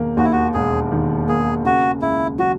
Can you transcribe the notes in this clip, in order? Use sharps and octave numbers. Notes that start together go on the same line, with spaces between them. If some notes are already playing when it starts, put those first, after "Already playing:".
Already playing: E1 D#2 D#3 A#3
D#2 F#4
E4
F#4
E1 G#4
D#3
A#3 G#4
C#3 F#4
C#2 E4
F#3 F#4